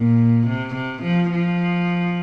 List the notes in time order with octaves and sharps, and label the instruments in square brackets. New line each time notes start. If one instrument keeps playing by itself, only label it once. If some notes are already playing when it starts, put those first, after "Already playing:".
Already playing: [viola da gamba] A#2
C3
C3
F3
F3